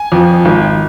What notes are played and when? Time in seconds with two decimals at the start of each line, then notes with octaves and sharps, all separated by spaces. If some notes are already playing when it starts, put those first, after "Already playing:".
Already playing: G#5
0.12 F2 F3
0.45 G#1